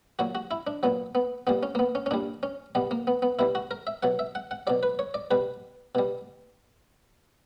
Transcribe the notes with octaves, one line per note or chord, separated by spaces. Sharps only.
A#2 F#3 F#4
F#4
E4
D4
A#2 F#3 B3
B3
A#2 G3 B3
C#4
A#3
B3
C#4
C#4
A#2 G3 D4
C#4
B2 G3 B3
A#3
B3
B3
B2 G3 E4
F#4
A#4
E5
B2 F#3 F#5
E5
F#5
F#5
B2 F#3 D5
B4
C#5
D5
B2 G3 B4
B2 G3